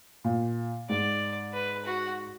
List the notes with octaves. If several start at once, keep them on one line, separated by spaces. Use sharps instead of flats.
A#2
G#2 D5
B4
F#4